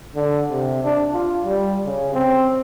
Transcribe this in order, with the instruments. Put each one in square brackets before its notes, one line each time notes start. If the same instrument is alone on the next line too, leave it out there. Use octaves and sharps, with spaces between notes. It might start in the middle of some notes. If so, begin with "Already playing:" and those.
[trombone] D3
C3
D4
F4
G3
C#3
C4